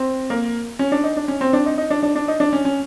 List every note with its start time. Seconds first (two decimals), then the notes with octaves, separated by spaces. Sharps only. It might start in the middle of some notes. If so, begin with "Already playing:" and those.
Already playing: C4
0.30 A#3
0.79 C#4
0.92 D4
1.04 D#4
1.17 D4
1.28 C#4
1.41 C4
1.53 D4
1.66 D#4
1.78 D#4
1.90 D4
2.03 D4
2.16 D4
2.28 D#4
2.40 D4
2.53 C#4
2.65 C#4